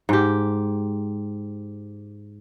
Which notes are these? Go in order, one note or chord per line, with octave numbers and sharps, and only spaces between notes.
G#2 G4